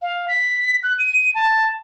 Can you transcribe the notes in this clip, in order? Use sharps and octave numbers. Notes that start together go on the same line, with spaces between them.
F5
B6
F#6
D#7
A5